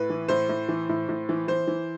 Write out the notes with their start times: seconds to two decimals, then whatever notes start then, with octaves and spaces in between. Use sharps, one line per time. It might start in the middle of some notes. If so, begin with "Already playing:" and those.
Already playing: A2 B4
0.10 E3
0.28 A2 C5
0.49 A2
0.68 E3
0.89 A2
1.09 A2
1.29 E3
1.48 E3 C5
1.67 E3